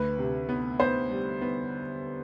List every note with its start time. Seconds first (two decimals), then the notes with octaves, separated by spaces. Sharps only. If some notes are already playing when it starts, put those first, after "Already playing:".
Already playing: D2 B4
0.18 C3
0.49 B3
0.80 B3 C5
1.10 G3
1.41 B3